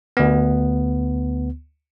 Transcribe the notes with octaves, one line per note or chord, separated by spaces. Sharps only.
D2 B3